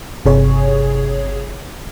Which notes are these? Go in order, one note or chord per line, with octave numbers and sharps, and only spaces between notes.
G1 C3 G#4 C#5